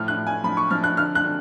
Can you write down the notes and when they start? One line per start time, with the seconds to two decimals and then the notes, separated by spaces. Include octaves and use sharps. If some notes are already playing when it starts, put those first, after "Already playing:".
Already playing: A2 F3 F6
0.08 F#6
0.16 A2
0.27 G#5
0.44 F3 B5
0.57 C#6
0.71 F3 F6
0.84 F#6
0.97 D3 F6
1.15 F#6
1.24 D3